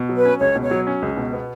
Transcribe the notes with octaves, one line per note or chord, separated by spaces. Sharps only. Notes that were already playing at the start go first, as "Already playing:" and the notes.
Already playing: B2
F#3
B4
C#4
C#2 C#5
B2
C#5
F#3
C#4
C#2
B2
B3